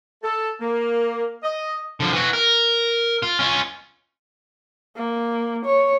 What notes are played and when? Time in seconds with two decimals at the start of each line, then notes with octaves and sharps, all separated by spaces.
0.23 A4
0.61 A#3
1.43 D#5
2.00 D3 F3
2.13 E3 F#4
2.33 A#4
3.23 F4
3.39 C#4 F4
4.96 A#3
5.65 C#5